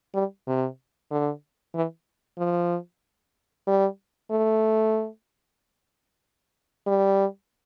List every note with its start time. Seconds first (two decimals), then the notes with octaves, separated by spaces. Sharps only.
0.14 G3
0.47 C3
1.11 D3
1.75 E3
2.38 F3
3.67 G3
4.31 A3
6.87 G3